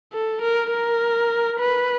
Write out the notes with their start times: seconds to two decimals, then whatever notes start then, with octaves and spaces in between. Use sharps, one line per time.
0.13 A4
0.41 A#4
0.71 A#4
1.59 B4